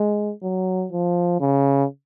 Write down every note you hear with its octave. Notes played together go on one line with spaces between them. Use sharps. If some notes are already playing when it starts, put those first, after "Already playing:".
Already playing: G#3
F#3
F3
C#3